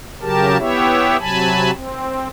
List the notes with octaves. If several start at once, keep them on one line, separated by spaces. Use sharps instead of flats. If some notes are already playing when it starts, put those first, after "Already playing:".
C#3 F#3 G4 A#4 A5
B3 E4 G4 C#5 E5
C3 F#3 G#5 A5 B5
C4